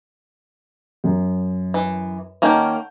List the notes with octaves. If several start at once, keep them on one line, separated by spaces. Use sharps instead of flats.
F#2
E3
D#3 A#3 C#4 F#5 A5 G6